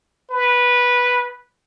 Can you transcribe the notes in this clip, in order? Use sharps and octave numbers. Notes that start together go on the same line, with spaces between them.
B4